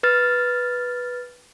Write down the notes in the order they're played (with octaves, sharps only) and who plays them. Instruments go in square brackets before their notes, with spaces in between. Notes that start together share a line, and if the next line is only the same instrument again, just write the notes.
[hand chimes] B4 F6 A6